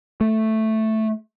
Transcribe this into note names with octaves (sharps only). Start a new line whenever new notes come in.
A3